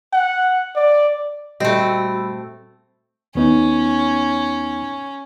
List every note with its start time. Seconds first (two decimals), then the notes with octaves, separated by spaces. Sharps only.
0.13 F#5
0.75 D5
1.60 A#2 G3 A3 C4 F#4 D#5 B5 E6
3.35 D#2 B3 C#4 D#4